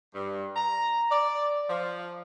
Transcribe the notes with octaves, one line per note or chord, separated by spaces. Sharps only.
G2
A#5
D5
F3